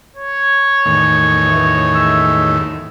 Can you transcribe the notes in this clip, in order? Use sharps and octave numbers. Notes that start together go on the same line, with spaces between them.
C#5
E2 A2 D#3
E3 A3
G#3 E5 E6